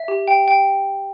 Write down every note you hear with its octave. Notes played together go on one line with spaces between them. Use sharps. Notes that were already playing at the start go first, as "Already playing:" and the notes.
Already playing: E5
G4
G5
G5